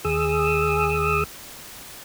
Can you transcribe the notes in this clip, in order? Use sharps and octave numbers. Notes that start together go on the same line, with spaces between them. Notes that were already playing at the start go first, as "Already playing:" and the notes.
D#2 G#4 D#6 E6